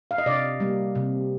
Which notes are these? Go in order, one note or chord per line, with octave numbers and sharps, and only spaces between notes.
F5
D#5
C3 D5
G3 A#3
C3